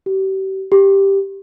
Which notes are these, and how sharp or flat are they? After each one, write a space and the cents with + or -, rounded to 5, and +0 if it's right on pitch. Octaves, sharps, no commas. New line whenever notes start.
G4 -35
G4 +0